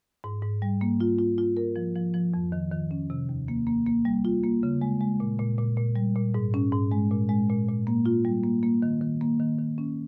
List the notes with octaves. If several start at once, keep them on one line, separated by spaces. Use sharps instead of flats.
G#2
G#2
G3
A#3
F4
F4
F4
A#4
F3
F3
F3
F2
D#3
D#3
C#4
C3
D#2
A#3
A#3
A#3
G3
F4
A#3
C#3
G#3
G#3
A#2
A#2
A#2
A#2
G3
A#2
G#2
C#4
G#2
G#3
A#2
G#3
A#2
A#2
A#3
F4
G3
A#3
A#3
D#3
D#3
A#3
D#3
D#3
C#4